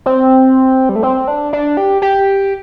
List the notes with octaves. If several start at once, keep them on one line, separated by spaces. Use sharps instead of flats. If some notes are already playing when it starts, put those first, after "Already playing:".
C4
G3
A3
C4
D4
D4
G4
G4